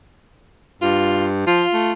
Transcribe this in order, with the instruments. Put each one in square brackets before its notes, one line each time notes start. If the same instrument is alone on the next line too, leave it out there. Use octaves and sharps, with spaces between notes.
[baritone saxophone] G2 [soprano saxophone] F4
[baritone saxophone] F3 [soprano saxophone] F4
[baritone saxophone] A3